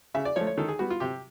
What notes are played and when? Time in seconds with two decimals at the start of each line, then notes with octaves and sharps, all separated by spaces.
0.14 C#3 E5
0.25 D5
0.36 F3 A3 C#5
0.47 C#5
0.58 D#3 A4
0.68 G#4
0.79 G3 B3 F#4
0.90 F4
1.00 C3 G4